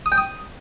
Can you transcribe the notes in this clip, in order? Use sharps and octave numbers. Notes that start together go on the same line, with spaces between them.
D#6
G5
D#6